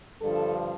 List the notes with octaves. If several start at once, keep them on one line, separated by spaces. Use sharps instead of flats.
G2 D3 F3 A4